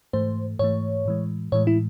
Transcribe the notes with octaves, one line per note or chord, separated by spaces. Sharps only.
G#2 E3 A3 C5
G#2 E3 A3 C#5
A2 E3 G#3
A2 E3 G#3 C#5
E4